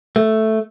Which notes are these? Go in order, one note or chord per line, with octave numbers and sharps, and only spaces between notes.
A3